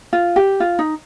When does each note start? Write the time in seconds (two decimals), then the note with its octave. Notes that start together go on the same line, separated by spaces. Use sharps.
0.13 F4
0.36 G4
0.60 F4
0.79 D#4